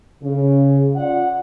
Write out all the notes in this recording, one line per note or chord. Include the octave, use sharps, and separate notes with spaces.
C#3
F4 D5 F#5